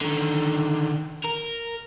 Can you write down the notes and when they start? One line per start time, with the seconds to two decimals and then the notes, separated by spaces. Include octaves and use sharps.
0.01 D3 D#3
1.25 A#4